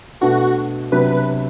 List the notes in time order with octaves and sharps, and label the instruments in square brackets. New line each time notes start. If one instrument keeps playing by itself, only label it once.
[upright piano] B2 A3 D4 [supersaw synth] F#4
[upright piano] C3 F#3 B3 D4 F#4 [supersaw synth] B4